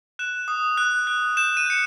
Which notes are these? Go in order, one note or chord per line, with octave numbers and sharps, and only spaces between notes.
F#6 E7
D#6
F#6
F#6
G6 E7
D#7
G6 C#7